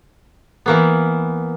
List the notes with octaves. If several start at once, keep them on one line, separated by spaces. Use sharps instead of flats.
E3 A#3 B3